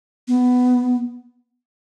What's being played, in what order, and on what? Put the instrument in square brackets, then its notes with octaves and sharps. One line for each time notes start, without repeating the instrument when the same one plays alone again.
[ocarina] B3